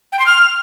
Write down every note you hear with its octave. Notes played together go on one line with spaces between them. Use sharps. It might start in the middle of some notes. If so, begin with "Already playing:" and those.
G5
C6
F6